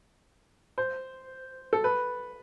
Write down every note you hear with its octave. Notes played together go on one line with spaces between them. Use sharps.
C5
A4
B4